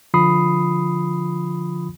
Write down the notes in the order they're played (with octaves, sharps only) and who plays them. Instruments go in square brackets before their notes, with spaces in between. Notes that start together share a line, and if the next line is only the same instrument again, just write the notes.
[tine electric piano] D3 F3 F4 B5 D#6 C7